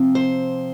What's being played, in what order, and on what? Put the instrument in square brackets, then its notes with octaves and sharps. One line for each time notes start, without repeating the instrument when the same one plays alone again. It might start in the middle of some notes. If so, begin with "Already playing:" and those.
Already playing: [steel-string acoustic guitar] C3 F3 C4
C5